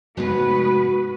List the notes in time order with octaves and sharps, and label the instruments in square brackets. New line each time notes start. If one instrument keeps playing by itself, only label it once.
[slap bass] F1 G#2 G#3 [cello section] B3 B4 [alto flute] F#4